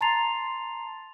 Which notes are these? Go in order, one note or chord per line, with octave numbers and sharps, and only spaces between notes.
A5 A#5 C6 A6 C7 F7